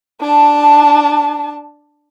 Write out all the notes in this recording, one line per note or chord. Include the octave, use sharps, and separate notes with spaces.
D4 A5